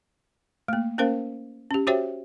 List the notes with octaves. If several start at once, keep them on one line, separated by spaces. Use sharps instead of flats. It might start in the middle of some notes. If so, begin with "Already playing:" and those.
A3 A#3
A#3 C#4 A#4 C5 F5
C#4 G4
F#4 G4 C5 C#5 E5 G5